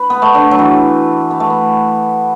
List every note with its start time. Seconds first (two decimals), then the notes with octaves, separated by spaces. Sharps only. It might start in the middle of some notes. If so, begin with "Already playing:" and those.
Already playing: B4
0.10 B3
0.22 A3
0.35 D3
0.51 F#3
0.59 E3
1.31 B3
1.40 A3
1.50 B3